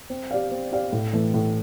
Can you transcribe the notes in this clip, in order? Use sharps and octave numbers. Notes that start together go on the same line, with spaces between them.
C4
G4 D5 F5
C4
G4 D5 F5
A2
E3 A3
A2